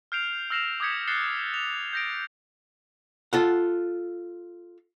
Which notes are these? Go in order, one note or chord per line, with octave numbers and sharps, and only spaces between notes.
F6 G6 C7 D7 F7
E6 F6 A#6 C7 E7 F7
D6 D#6 G6 G#6 B6 C#7
F#6 A6 C7 C#7 G7
F7
G6 A#6 D7
F4 A4 F#5